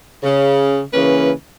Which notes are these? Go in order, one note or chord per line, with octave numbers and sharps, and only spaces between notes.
C#3
C#3 E3 A#3 C#4 B4